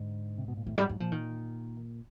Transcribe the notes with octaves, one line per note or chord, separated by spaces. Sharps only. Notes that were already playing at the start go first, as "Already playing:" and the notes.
Already playing: G#2 D3
C3
B2
A#2
A2 D#3
G#2 G3
G#2 F#3
A#2 F3
D#3